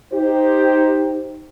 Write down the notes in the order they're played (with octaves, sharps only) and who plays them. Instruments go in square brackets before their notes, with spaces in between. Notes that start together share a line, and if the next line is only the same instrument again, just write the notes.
[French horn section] D#4 G4 C5